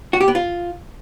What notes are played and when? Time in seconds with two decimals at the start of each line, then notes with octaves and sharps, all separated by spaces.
0.13 F#4
0.21 G4
0.28 B3
0.35 F4